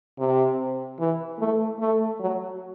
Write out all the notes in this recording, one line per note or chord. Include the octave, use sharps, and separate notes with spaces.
C3
E3
A3
A3
F#3